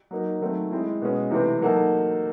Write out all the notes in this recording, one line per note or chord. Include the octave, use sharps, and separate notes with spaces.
F#3 A#3 D#4 F#4
D#3 F#3 A3 C4
G#3 C4 E4
B2 G#3 C#4
C3 E3 A3 C4
F#3 A#3 D#4 F#4 A4